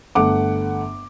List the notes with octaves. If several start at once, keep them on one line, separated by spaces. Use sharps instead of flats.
G1 A3 F#5 D6